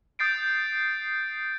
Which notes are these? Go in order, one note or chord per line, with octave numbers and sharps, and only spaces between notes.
D#6 G6 A6 C7 D7